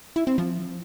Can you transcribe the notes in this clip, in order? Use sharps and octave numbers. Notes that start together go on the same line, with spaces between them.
E4
C4
F3